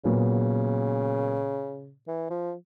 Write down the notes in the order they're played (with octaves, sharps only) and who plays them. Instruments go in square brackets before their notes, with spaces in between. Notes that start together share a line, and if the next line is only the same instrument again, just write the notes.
[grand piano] A#2 F#3 B3 [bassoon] C#3
[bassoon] E3
F3